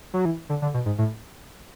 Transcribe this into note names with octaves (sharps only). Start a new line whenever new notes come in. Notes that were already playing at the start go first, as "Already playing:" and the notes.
F#3
E3
D3
D3
B2
G#2
A2